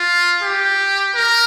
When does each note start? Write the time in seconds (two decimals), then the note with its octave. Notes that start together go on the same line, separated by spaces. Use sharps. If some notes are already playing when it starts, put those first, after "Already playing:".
Already playing: F4
0.42 G4
1.15 A#4